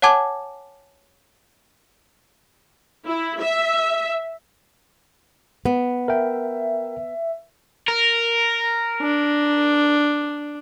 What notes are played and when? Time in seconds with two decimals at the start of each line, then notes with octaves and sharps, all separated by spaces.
0.02 C#5 F#5 G#5 A5 D6 G#6
3.06 E4
3.40 E5
5.65 B3
6.08 A#4 E5 G5
7.88 A#4
9.02 D4